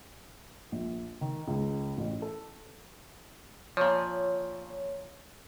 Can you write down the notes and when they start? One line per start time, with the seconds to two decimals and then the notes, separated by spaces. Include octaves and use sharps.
0.72 A#1
1.21 D#3
1.48 C#2
1.97 A1
2.22 A4
3.77 A#2 F3 C#5